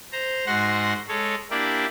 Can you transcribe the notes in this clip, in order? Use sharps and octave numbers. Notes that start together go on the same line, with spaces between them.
C5 A#5
G#2 F#4 F#5 C6 A#6
G#3 A4 C#5
A#3 D4 E4 G4 D5